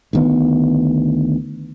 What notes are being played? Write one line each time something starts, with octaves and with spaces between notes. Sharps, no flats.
D2 D#3 B3